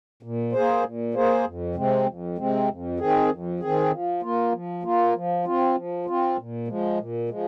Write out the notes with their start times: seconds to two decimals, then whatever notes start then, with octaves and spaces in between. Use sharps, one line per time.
0.23 A#2
0.52 A#3 G#4 C5
0.84 A#2
1.14 A#3 G#4 C5
1.45 F2
1.75 C3 G#3 C4
2.06 F2
2.38 C3 G#3 C4
2.69 F2
2.99 D#3 C4 G#4
3.30 F2
3.60 D#3 C4 G#4
3.91 F3
4.22 A#3 F4
4.52 F3
4.83 A#3 F4
5.14 F3
5.45 C4 F4
5.75 F3
6.06 C4 F4
6.38 A#2
6.68 F3 G#3
6.99 A#2
7.29 F3 G#3